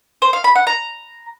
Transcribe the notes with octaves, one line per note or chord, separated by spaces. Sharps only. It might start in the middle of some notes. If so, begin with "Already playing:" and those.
C5
F5
B5
F#5
A#5